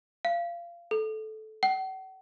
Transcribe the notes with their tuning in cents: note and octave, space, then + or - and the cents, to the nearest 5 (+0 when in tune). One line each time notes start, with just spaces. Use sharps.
F5 -25
A4 -15
F#5 +45